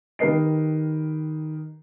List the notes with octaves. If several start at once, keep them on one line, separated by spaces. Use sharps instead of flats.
D#3 G4 A#4 B4 D#5 C7